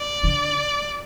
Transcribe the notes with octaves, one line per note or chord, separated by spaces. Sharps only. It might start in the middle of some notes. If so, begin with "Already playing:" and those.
Already playing: D5
D3